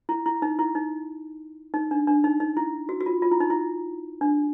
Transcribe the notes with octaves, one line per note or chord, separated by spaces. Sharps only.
E4
E4
D#4
E4
D#4
D#4
D4
D4
D#4
D#4
E4
F#4
F#4
F4
F4
E4
D#4
E4
D4